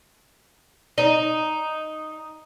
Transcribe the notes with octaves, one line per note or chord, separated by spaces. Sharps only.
D#4